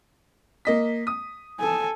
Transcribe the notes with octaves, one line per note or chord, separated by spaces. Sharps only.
A#3 D#5 B6
D#6
A4 G#5